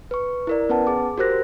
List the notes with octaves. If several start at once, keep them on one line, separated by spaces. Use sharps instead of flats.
B4 C#6
E4 A#4 D5
B3 C#4 B4 F#5 A5
G#4 D6
F#4 G4 A#4 C5 F#6 A#6